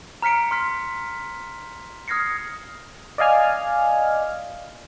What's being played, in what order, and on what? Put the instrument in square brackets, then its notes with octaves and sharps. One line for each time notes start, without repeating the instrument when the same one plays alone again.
[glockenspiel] A#5 F6 B6 C#7 D7
A#5 C6 F6 B6
D#6 F6 G#6 A#6 C7 C#7
[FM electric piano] D5 D#5 F5 G#5 F6